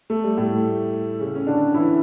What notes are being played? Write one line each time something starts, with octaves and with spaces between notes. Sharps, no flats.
A3
G3
A2 A3
C#3 C#4
C#4
D3 D4
E3 E4